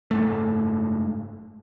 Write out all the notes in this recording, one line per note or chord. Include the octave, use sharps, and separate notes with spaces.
F#1 G#2 A3